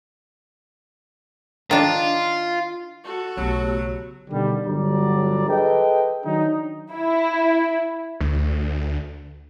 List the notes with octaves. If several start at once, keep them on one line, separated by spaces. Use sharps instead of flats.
D#3 D4 F4
F#4 A4
B1 C#3 F#3 A3 B3 G4
B2 D3 D#3 G3
G1 D3 F#3 G3 D5 A#5
G#4 A4 B4 D#5 G5
D#3 F#3 D4 D#4
E4
D2